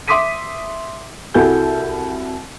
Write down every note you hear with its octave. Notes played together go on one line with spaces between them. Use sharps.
E5 C6 D6 D#6 B6 D#7
C2 E4 F#4 A4 G#5 G6